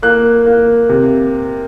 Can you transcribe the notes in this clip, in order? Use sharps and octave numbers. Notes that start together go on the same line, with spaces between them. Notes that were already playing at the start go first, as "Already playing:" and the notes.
A#3 F#6
A#3
C3